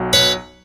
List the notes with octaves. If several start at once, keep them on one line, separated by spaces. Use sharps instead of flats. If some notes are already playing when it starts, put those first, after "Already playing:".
Already playing: B1 F#3
B4 C#5